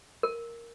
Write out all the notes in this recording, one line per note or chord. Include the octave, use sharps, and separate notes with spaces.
A#4